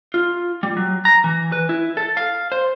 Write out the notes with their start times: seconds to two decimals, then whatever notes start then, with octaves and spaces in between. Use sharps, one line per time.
0.14 F4
0.63 G3
0.77 F#3
1.05 A#5
1.24 E3
1.52 B4
1.69 E4
1.97 A4
2.17 F5
2.52 C5